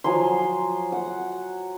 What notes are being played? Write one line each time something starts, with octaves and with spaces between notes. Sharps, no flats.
F3 F#3 G#5 C6
F#5